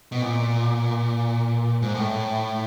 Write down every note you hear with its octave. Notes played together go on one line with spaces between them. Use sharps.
B2
A#2
G#2
A2